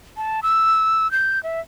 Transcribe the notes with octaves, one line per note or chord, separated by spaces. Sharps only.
A5
E6
G6
E5